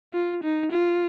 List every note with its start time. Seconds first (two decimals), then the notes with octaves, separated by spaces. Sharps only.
0.14 F4
0.43 D#4
0.72 F4